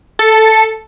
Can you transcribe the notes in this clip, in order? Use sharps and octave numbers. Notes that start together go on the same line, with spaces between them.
A4